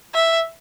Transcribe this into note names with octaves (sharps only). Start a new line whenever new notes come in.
E5